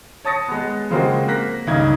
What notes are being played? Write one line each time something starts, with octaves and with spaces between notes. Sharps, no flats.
C#5 A5 D#6 A6 A#6 C#7
G#3 B3
C#3 F3 G#3 A#3 C4 F#4
A#3 F#6 A#6 B6
C#2 G2 D#3 C#4 D#4 G#6